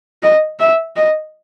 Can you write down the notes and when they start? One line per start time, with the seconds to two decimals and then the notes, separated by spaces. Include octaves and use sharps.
0.23 D#5
0.59 E5
0.96 D#5